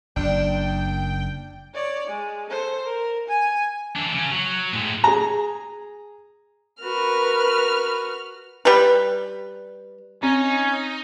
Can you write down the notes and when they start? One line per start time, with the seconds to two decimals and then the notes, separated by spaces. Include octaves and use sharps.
0.16 F#1 D4 G5
1.75 C#5 D5
2.07 G#3
2.50 A4 C5
2.84 A#4
3.28 G#5
3.96 E3 D4
4.15 C#3 C#4
4.32 F#3
4.73 A2 G#3
5.04 G#4 A#5
6.83 F#4 A#4 B4 F6
8.65 G3 B4
10.23 C4 C#4 D#4